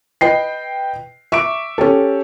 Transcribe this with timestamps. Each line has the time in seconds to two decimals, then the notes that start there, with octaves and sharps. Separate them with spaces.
0.21 B4 D#5 G5 C7
1.32 E5 C#6 D6 D7
1.78 C#4 G4 A4